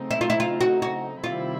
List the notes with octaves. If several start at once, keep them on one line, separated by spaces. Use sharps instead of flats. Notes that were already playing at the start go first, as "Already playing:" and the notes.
Already playing: C#3 F#3 A3 C4 D#4
E4
F4
E4
F4
F#4
F#4
C3 D#3 G3 C4 E4 F4